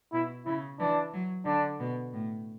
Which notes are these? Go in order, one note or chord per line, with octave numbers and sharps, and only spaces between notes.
B2 E4
C#3 E4
E3 D4
F#3
D3 D4
B2
A2